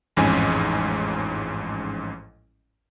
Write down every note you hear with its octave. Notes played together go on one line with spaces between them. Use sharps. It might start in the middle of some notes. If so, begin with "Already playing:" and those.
A1 F2 G#2 C#4 G#5